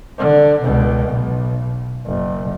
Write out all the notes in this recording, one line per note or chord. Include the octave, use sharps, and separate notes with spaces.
D3
C#2 B2
B1
F#1